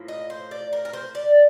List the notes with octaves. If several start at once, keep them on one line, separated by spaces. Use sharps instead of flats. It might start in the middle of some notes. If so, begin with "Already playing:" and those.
Already playing: A2 F3 A#3
D#5
C5
D5
A#4
A#4
C5
D5